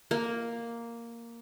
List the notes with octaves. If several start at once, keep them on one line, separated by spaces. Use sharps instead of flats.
A#3